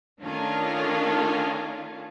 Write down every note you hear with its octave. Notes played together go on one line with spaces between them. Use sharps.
D#3 A3 C#4 D4 F4